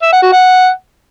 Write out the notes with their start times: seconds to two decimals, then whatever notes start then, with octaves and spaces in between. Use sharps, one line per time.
0.02 E5
0.12 F#5
0.22 F#4
0.33 F#5